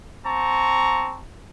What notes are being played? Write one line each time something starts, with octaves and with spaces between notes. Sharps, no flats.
C4 A5 A#5 C#6